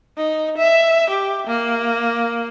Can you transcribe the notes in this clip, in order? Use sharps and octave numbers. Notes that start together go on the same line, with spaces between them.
D#4
E5
G4
A#3